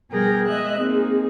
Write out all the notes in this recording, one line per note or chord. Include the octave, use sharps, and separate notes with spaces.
B2 G3 G#4 A#4 G5 A#6
G#3 D#5 E5 F#6
A#3 C4 D#4 G#4